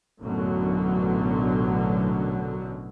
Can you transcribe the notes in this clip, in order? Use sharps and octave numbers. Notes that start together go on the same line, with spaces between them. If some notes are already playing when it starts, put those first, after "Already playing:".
A1 F#2 B2 D3 F#3